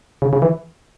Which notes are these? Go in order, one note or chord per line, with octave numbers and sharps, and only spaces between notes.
C#3
C#3
E3